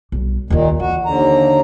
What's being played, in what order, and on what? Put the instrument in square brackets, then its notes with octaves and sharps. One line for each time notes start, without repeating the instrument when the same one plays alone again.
[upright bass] B1 G3
[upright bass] D#2 F4 [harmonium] A#2 D#3
[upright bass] E3 [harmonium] F#4
[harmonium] D#2 D3 A#5